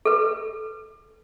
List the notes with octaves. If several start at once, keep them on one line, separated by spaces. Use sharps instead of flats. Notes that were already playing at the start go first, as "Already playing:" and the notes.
A4 B4